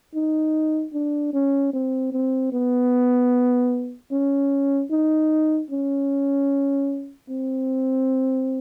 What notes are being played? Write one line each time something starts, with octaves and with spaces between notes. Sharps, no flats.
D#4
D4
C#4
C4
C4
B3
C#4
D#4
C#4
C4